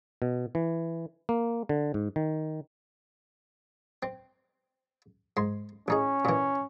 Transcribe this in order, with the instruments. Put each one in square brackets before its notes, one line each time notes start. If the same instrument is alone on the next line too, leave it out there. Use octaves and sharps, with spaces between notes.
[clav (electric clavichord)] B2
E3
A#3
D3
G#2
D#3
[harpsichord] C4
G#2 C6
[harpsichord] A1 D#4 G#4 [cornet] C#4
[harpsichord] A#2 E3